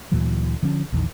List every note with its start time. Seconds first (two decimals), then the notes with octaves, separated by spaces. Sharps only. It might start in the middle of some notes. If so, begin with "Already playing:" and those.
0.12 D2 A#2 E3 F#3
0.63 D3 F3 C#4
0.92 A#1 E2 D#3